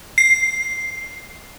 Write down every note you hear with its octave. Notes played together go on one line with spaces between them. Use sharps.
C7